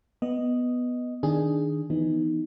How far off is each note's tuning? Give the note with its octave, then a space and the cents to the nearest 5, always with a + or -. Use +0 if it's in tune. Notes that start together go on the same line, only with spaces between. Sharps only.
B3 +0 D#5 +0
D#3 +0 D4 +0 G#4 +0
E3 +25 B3 +0 D#4 +5